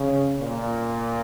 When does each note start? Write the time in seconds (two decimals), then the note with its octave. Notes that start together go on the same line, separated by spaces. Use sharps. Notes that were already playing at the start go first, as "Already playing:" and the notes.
Already playing: C#3
0.40 A#2